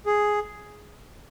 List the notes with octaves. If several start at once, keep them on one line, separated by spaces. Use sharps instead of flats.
G#4